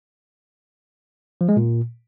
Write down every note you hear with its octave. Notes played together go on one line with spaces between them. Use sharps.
F3
G#3
A#2